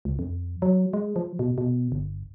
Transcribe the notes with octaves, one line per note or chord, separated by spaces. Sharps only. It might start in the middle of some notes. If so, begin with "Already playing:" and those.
C#2
F2
F#3
G#3
F3
B2
B2
G1